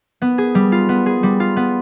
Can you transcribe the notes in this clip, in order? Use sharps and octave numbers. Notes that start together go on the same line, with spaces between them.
B3
G#4
G3
F4
B3
G#4
G3
F4
B3